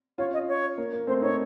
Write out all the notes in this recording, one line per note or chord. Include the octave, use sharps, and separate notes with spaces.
C#4 F4 C#5
D#5
C#5
A#3
A#3
A3 C4 C5
C4 D#4 C#5